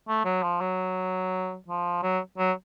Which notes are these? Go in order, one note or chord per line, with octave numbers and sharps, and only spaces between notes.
A3
F#3
F3
F#3
F3
F#3
F#3